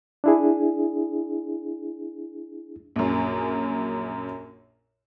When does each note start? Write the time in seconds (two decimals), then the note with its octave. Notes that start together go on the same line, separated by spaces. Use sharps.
0.24 D4 E4 G#4
2.96 A#1 F#2